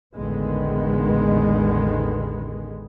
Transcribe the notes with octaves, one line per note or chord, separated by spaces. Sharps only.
A1 E2 D3 D#3 G#3 B3